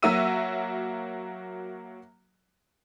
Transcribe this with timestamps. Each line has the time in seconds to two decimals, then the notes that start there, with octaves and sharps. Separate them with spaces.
0.02 F#3 A#3 F#4 E5 E6 D#7